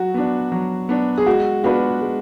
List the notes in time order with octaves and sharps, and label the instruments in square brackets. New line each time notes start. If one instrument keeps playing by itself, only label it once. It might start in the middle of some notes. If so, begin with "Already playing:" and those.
Already playing: [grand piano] F#3 [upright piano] F#4
[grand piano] B3 D4
F#3
B3 D4
[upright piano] G#4
[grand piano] G#3 [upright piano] F#4
[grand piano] B3 D4 F4 B4 [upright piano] F#4
[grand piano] G#3